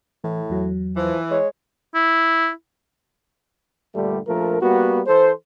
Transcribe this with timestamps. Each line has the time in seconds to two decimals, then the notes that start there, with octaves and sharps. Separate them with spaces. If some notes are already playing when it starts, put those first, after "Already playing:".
0.24 A2 E3
0.49 E2 F#3
0.97 E3 F3
1.31 G#3 C#5
1.95 E4
3.95 G2 A#2 D3 G3 A3
4.27 A#1 F3 A3 A#4
4.61 G3 A#3 B3 F#4
5.07 E3 A4 C5